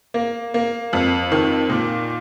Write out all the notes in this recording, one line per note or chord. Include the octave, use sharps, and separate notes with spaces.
A#3
A#3
F2
D#3
A#2